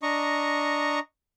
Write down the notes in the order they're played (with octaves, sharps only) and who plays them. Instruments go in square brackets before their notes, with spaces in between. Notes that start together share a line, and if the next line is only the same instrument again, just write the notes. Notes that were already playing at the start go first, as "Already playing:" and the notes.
[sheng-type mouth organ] D4 D#5 A#5 C#6